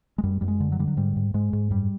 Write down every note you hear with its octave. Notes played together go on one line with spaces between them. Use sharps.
G#3
F#2 G3
F#2 G3
G#3
D3
F#3
D3 G3
F#3
G#2 G3
G#2
G#2 G#3
G#2
F#2 G3